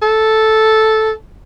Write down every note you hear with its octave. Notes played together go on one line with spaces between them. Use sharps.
A4